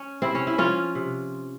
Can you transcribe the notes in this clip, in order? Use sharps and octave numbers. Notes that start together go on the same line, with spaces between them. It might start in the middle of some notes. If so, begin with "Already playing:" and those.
Already playing: C#4
C3 C4 E4
C#4
E4
F3 C#4 F4
C3